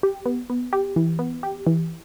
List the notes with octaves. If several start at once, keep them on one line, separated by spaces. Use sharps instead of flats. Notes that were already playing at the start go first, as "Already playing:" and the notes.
G4
B3
B3
G4
E3
B3
G4
E3